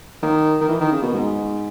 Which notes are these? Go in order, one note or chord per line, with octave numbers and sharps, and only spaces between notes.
D#3
D#3
E3
D#3
C#3
B2
G#2